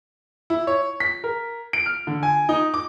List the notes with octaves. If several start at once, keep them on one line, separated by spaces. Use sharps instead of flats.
E4
C#5
B6
A#4
D7
F6
D3
G#5
D#4
D6